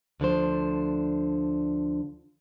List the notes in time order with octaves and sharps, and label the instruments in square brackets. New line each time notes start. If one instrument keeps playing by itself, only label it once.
[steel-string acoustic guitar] D2 D3 F3 C5